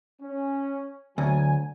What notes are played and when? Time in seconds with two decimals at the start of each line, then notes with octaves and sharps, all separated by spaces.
0.22 C#4
1.18 D2 F#3 G#5